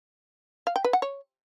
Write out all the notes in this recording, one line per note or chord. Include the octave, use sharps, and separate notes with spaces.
F5
G5
B4
F#5
C#5